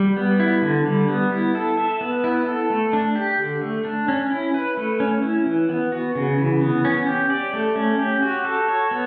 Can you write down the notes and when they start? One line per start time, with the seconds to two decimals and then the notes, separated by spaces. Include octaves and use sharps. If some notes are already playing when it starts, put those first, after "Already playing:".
Already playing: G3
0.17 B3
0.40 E4
0.62 D3
0.85 G3
1.08 B3
1.32 E4
1.55 A4
1.77 E5
2.01 B3
2.24 E4
2.46 A4
2.70 A3
2.93 D4
3.15 G4
3.38 D3
3.61 A3
3.85 D4
4.08 C#4
4.30 E4
4.54 B4
4.77 A3
5.00 C#4
5.23 E4
5.46 E3
5.69 B3
5.92 F#4
6.15 C#3
6.38 E3
6.61 B3
6.85 C#4
7.07 G4
7.30 D5
7.53 A3
7.76 C#4
7.99 G4
8.22 F#4
8.45 A4
8.68 C#5
8.91 B3